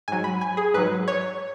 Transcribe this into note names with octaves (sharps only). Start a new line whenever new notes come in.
G#2 F#3 G#5
B5
G#5
G#4
G#2 F#3 B4
C#5